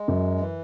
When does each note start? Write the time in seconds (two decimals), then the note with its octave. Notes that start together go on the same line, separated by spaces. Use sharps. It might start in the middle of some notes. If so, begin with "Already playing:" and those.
Already playing: G#3
0.08 F#2
0.40 E3